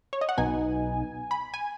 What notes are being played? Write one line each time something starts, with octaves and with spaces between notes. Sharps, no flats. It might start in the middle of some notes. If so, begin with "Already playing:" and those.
C#5
D#5
F#5
B1 B2 B3 D#4 G#5
B5
G#5